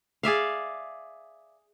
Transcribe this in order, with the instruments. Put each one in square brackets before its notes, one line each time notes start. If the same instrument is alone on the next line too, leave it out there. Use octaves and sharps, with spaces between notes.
[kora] G#4 D5 E5 F5